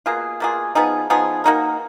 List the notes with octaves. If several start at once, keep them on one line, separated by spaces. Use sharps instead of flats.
B2 A#3 F4 G#4
B2 A#3 F4 G#4
F3 B3 D#4 G#4
F3 B3 D#4 G#4
A#3 D#4 F#4 A#4